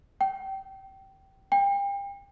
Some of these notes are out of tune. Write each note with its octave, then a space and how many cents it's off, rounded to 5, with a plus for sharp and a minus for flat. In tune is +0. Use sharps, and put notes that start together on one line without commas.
G5 -20
G5 +35